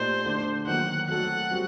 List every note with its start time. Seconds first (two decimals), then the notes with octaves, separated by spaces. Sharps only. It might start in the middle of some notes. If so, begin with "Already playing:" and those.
Already playing: A#2 A3 D#4 G4 C5 D5
0.25 D3 A3 D4
0.67 D#3 F#3 A#3 F#5
1.08 F#3 A3 C4 F#4 A4 F#5
1.50 G3 C4 F#4